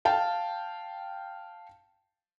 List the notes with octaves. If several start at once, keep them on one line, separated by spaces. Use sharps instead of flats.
F5 G5 A5